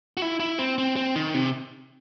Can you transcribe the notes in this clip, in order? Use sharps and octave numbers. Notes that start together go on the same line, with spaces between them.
F#4
E4
E4
C4
C4
C4
D#3
C3